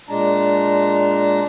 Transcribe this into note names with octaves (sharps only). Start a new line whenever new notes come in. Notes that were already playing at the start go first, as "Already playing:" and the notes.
A#2 G#3 D4 A5 A#5